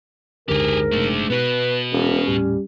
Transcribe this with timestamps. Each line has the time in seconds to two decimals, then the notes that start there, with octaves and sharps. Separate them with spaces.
0.49 F#1 D2 G#2 D3 G4 G#4 A#4
0.92 F#1 C3 A3 D4
1.30 B2 B3 F#4 B4
1.92 E1 C#4
2.27 D#1 A2 G3